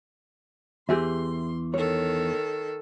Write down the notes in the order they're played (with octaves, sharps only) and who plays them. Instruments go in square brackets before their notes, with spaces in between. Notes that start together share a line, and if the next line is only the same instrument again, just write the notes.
[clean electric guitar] E2 [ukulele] G4 G#4 E5 [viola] C6
[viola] D#3 A4 [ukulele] C#5